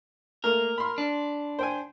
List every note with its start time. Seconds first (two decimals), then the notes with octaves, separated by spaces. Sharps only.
0.44 A3 A#3 A#4
0.78 B5 C6
0.98 D4
1.59 C5 G5 G#5